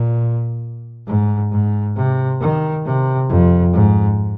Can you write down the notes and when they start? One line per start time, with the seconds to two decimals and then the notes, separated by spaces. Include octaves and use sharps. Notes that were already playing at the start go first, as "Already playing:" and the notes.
Already playing: A#2
1.07 G#2
1.51 G#2
1.96 C3
2.41 D#3
2.85 C3
3.29 F2
3.73 G#2